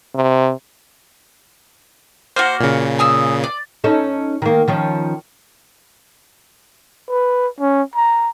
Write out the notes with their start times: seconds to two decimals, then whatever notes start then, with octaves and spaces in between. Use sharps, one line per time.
0.15 C3
2.36 A#3 F#4 C5
2.60 A#2 C#3
2.99 G#5 D#6 E6
3.44 D5
3.84 C#4 D#4 A4
4.42 D#3 A#3
4.68 D#3 F3 C#4
7.09 B4
7.60 C#4
7.95 A#5